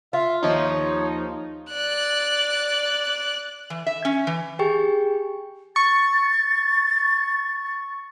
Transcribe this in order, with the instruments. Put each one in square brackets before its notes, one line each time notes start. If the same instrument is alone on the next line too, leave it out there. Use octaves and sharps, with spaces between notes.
[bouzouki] F4 [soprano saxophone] E5
[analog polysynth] D#2 F3 D#4 [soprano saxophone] C#5
[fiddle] D5 F#6
[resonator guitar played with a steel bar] E3
E5
C#4
E3
[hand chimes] G4 G#4 G5 C#6
[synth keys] C#6 [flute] A6